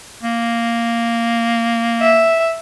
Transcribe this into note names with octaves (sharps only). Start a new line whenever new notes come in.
A#3
E5